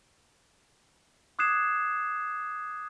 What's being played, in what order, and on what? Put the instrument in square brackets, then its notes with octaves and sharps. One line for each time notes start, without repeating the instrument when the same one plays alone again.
[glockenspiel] D6 D#6 F#6 G#6 C7 E7